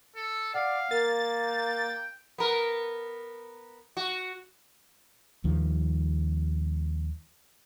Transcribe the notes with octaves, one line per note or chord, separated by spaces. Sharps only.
A4
D5 F5 F#5
A#3 A#4 A6
G5
B3 A#4
F#4
D#2 D#3 F3 G3